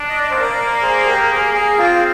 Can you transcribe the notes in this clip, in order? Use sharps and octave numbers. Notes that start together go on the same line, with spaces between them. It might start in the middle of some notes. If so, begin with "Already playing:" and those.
Already playing: D4
D#5
D5
A#3 C5
A#4 D5
G#4 C5
G4 A#4
A#4
G#4
G#4
C4 F4